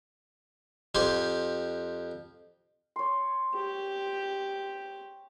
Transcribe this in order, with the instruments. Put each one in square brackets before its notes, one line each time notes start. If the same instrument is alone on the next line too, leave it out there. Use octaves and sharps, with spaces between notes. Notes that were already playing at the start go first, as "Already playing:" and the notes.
[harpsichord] F2 G4 G#5 C6
[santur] C#5 C6
[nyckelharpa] G4